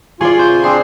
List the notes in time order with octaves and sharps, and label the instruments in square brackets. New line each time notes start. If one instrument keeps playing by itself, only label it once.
[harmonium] F4 [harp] G#4 D5 [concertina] G#5 [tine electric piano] C6 C#6
[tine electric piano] C3 C5 G6
[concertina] C4 D4 G#4 [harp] C6